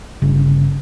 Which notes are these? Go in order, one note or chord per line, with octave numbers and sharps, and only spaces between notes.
G1 C#3